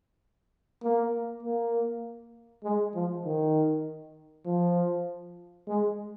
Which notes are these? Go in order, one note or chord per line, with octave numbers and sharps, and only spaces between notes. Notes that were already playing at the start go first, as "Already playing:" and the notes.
A#3
A#3
G#3
F3
D#3
F3
G#3